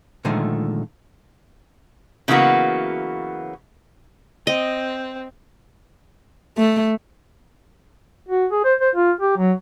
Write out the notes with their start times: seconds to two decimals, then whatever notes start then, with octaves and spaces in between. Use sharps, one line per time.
0.25 A#2 D3 D#3 F3 G#3 A3
2.28 C#3 E3 F#3 A#3 B3 F#4
4.47 C4 D#5
6.58 A3
8.28 F#4
8.51 G#4
8.64 C5
8.80 C5
8.95 F4
9.21 G4
9.37 F#3